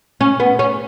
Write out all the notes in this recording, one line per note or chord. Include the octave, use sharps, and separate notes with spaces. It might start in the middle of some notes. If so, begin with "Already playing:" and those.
C#4
B3
C#4